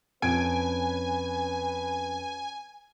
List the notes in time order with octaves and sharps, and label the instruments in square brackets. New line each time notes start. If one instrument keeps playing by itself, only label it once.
[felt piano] F2 G#6 D7 [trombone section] C#4 B4 [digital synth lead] G#5